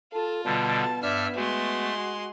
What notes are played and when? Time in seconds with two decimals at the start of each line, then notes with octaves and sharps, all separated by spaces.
0.13 F4 A4 A5
0.45 B2 D3 G3 B3 A5
1.03 G2 D5 E5 E6 F6
1.36 G#3 A3 F#4 C6